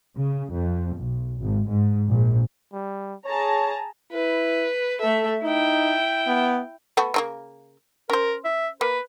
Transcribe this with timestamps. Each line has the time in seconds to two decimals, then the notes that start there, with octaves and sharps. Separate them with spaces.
0.16 C#3
0.52 F2
0.96 B1
1.39 G#1
1.69 G#2
2.09 A#1
2.73 G3
3.26 G#4 C#5 A5 A#5
4.12 E4 B4
5.00 A3 A4 E5
5.44 D#4 E4 G5
6.27 B3
6.97 A3 B3 F#4
7.14 C#3 F3 A#3
8.10 C#4 A#4 C5
8.44 E5
8.81 A#3 B4